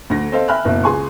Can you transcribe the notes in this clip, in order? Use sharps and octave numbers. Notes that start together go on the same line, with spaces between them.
D2 D3 A#6
C4 A4 C5 D#5 F5
E5 G5 G#5 B5 F6 F#6
F#1 B2 E4 E5
C#2 G#4 G#5 C6 C#6